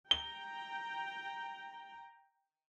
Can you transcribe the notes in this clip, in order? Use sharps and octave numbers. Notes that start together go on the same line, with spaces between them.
G5 A#5 G7